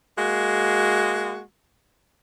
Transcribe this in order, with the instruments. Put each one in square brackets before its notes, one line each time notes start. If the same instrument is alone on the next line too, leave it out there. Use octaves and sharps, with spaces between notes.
[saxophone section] G#3 A#3 F#4